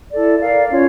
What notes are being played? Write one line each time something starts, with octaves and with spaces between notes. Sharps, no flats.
E4 A4 D5
A#4 D5 F5
C#4 F4 C#5